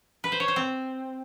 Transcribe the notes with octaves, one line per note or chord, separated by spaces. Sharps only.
B4
C5
C#5
C5
C4